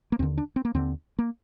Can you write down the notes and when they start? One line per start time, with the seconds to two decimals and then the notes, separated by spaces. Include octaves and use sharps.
0.12 A#3
0.19 D#2 D3 C4
0.38 D4
0.56 C4
0.65 A#3
0.75 D#2 D3 C4
1.19 A#3